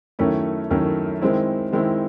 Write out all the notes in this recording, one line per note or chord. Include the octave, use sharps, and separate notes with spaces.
F#2 D#3 A3 C#4 E4
F#2 D#3 A3 C#4 E4
D#3 G#3 C4 E4
D#3 G#3 C4 E4